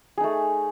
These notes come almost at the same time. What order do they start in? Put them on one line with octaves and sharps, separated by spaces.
G#4 D#4 A3